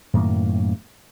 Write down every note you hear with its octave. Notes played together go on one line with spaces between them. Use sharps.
F#2 A2 D#3 A#3